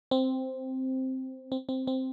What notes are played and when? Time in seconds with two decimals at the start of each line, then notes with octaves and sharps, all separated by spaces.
0.11 C4
1.52 C4
1.69 C4
1.87 C4